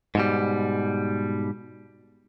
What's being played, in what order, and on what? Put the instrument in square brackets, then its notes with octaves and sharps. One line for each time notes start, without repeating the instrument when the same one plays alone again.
[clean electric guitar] G#2 B2 G3